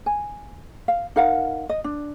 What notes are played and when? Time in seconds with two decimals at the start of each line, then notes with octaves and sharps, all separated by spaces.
0.06 G#5
0.88 F5
1.16 D#4 A#4 F5 F#5
1.69 D#5
1.84 D4